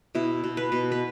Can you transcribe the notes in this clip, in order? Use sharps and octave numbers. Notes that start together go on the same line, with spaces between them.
B2 E4
B2
B4
B2
B4